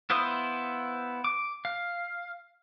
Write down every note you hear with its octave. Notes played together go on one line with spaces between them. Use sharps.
B3 E4 C5 F5 D#6
D6
F5